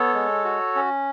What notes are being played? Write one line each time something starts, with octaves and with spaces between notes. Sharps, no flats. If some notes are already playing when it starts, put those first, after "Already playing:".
Already playing: B3 A4 C#5
G#3
F#4
C#4